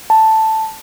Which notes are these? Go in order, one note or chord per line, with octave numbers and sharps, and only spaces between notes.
A5